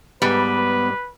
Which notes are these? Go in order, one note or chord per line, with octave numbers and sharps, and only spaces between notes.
G#2 G3 B3 B4